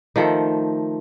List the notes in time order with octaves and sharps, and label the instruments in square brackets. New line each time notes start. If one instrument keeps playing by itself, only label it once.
[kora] D#3 F3 A3